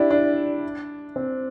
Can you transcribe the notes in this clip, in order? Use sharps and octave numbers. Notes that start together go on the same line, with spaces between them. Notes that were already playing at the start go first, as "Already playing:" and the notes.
Already playing: D4 E4 G4
D4
C4